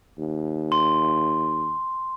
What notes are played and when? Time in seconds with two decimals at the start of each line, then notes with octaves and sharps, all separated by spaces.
0.18 D#2
0.72 C6